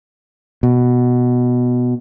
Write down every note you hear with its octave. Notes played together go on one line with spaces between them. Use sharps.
B2